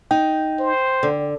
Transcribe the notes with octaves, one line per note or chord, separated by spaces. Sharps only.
D#4 G5
C5
D3